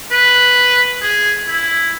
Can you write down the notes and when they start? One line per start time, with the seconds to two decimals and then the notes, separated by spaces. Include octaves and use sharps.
0.11 B4
1.02 G#4
1.48 E4